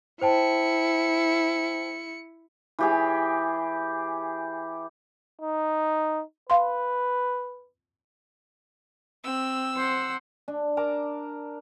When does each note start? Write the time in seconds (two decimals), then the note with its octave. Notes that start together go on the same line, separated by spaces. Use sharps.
0.21 E4 C5 G5 A5 C#7
2.79 E3 G4 G#4
5.42 D#4
6.50 B4 F5 C6
9.24 C4 E6
9.77 C5 F#5
10.48 D4
10.77 A#4 A5 A#5 D6